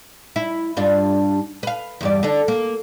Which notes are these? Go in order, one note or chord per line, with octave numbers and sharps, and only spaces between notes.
E4
G2 D4 F4
B4 F5
E2 G2 D5
D3 D4
A#3